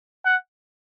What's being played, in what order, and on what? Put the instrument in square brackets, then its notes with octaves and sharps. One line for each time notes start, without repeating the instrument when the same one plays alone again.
[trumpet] F#5